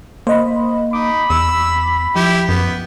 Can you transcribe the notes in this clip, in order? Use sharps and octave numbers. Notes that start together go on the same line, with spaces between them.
A#3 C5 D#5 B5
D#4 B5 D6
E2 E6
F3 E4 G4
F#2 B3